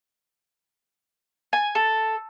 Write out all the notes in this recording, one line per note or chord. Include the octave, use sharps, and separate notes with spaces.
G#5
A4